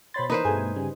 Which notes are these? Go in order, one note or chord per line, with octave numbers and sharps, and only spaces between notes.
B2 C5 C#5 B5 C6 A6
E3 A#3 D4 D#4 B4 C5
G2 B2 A3 G#4 G#5
C#3 G3